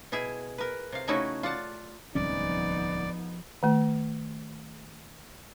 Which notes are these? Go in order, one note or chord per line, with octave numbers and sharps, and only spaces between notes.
B2 E4 G#4 E5
A#4 B4
C3 F5
C#3 A3 C#4 D#4 E4 F#4
F4 D5 F#5 A5
D1 C2 F3 G#3 B3 C#4 D#4 D5
D#3 A3